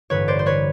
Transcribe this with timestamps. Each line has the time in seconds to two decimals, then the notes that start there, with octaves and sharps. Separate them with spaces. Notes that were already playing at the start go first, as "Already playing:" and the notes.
0.10 A1 G2 D3 B4 C#5
0.28 C5 D5
0.39 C5
0.46 B4 C#5